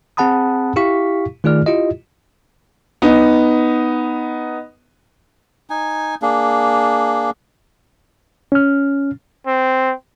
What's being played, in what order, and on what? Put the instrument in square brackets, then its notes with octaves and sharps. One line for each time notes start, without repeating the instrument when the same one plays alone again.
[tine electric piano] C4 G#4 F#5 A5 B5 D#6
E4 G4 F5 C#6 B6
D#3 A3 F4 G#4 D5 F6
E4 F4 G4 D#5
[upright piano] B3 D#4
[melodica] D#4 G#5
A#3 D4 G#4
[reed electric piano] C#4 F6
[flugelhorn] C4